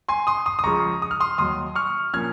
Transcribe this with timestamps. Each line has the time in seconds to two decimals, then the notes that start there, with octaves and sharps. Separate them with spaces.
0.09 G#5 C6
0.27 C6 D#6
0.46 C6 D#6
0.59 D#6
0.64 C#2 C#3 F3 A#5 C#6
1.02 D#6
1.11 F6
1.20 C6 D#6
1.38 D#2 D#3 F#3 C6 D#6
1.75 C#6 F6
2.13 A#2 F3 A#3 C#4 F6 G#6